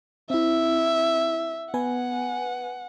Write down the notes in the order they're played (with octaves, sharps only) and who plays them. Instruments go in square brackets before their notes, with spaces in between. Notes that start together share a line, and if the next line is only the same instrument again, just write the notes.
[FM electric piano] C4 E4 [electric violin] E5
[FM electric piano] B3 B4 G#5 [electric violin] F#5